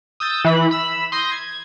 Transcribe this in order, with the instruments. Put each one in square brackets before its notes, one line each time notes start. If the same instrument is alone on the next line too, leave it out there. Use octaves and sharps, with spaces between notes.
[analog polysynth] D#6 E6 G6 A6
E3 B5
B5 E6
C6 D#6 G6 A#6
G#6